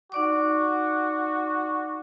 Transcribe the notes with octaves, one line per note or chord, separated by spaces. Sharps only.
D#4 F#4 D5 D6